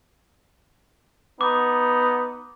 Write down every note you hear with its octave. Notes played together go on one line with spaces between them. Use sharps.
B3 D#4 D6